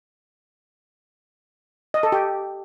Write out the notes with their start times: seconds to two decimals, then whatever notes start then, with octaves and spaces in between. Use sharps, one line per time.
1.94 D#5
2.03 A4
2.12 G4